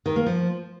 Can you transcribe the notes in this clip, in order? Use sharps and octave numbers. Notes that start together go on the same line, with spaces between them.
D#3
A#3
F3